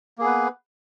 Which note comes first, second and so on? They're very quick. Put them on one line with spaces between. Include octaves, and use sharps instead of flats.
A#3 G#4 B3 B4